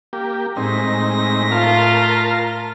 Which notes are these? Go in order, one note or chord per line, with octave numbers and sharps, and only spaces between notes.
A#3 G4
A2 G#3 C4 D#4 A#6
F4 A#4 A5 F6